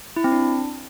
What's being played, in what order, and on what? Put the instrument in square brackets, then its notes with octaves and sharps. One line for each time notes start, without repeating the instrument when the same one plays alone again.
[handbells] E4
C4
D4